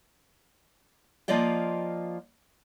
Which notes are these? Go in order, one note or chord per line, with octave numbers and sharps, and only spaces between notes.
F3 A#3 F4 D5 D#5 G5